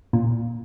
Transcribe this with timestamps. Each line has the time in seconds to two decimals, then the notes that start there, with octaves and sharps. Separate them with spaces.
0.13 A#2